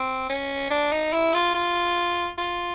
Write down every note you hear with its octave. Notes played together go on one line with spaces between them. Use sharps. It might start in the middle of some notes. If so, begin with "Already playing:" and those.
Already playing: C4
C#4
D4
D#4
E4
F4
F4
F4